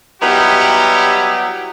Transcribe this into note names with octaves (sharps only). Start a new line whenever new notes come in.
F#3 G3 B3 D#4 E4 G4